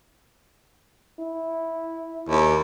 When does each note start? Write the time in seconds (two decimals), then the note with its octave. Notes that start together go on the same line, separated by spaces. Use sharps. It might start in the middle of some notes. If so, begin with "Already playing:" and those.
1.19 E4
2.29 D#2